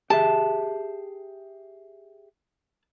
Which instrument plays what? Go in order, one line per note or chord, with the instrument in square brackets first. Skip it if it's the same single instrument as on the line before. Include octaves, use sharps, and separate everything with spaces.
[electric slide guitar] G4 G#4 E5 [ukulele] A5